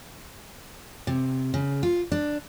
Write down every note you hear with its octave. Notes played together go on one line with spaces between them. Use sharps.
C3
C#3
F4
D4